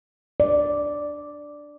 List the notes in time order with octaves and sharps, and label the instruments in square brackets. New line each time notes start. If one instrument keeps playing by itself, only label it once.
[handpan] D5